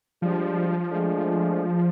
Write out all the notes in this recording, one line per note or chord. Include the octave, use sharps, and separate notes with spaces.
F3 G3 G#3 D4
G#3 A3 D4